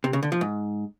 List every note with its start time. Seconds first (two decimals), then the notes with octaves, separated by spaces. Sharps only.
0.04 C3
0.13 C#3
0.23 D3
0.32 F3
0.41 G#2